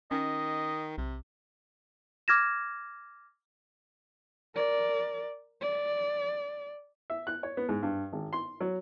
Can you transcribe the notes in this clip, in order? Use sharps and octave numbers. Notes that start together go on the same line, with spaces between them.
D#3 C#4 D#5
B1 C3
D6 F6 G#6 A#6 E7
A#4 D5
D5
E5
F#6
C#5
B3
G#2
G2
G#1
C6
F#3